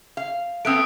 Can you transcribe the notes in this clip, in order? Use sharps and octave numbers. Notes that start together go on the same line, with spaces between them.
F5
A3 B3 C4 D#6 F#6 D7